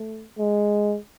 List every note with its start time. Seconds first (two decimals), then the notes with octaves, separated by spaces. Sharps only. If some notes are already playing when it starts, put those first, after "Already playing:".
Already playing: A3
0.39 G#3